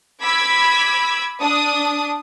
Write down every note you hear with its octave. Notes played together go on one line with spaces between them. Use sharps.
B5 D6 E6 G#6 B6
D4 D#6